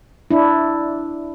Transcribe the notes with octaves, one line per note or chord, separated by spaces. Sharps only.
D4 E4